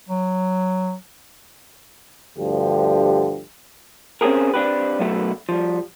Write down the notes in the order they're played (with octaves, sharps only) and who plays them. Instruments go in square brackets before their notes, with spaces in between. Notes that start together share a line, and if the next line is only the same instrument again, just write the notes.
[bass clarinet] F#3
[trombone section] D2 G2 D3 F3 G4
[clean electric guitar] C4 C#4 F4 G4 G#4 A#4
C4 D4 G4 B4
B1 F#2 F#3 A3 B3 E4
F3 G3